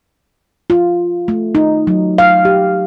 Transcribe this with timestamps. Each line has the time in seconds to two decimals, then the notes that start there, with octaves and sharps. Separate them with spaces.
0.70 F4
1.28 A3
1.55 D#4
1.87 F#3
2.18 F5
2.45 G4